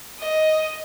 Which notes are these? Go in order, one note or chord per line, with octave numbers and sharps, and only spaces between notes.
D#5